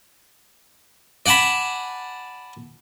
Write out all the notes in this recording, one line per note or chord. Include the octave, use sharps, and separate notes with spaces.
D5 F#5 G#5 A5 B5